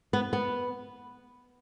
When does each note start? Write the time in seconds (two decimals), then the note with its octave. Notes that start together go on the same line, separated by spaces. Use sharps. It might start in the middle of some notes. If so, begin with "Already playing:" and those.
0.13 B3
0.33 B3